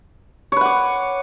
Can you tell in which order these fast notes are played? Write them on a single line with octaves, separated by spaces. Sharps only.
C#5 B4 F#5 D6